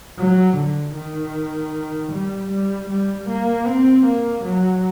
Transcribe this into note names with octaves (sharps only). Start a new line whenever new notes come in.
F#3
D3
D#3
G3
G3
G3
A#3
C4
A#3
F#3